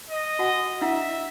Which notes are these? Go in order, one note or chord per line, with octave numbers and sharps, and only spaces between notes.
D#5
F#4 F#5 G#5
D4 E4 E5 F#5